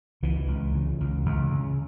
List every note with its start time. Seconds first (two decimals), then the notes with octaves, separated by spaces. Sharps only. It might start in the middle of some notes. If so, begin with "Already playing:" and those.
0.23 C#2 E3
0.48 C#2
0.74 C#3
1.00 C#2
1.26 C#2
1.52 C#3